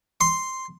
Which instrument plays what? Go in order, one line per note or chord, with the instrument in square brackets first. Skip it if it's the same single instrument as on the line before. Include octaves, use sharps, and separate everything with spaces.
[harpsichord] C6